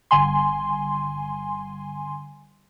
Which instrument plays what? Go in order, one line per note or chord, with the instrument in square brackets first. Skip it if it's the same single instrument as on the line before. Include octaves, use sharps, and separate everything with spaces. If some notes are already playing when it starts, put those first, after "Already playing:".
[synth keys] G1 G#5 C6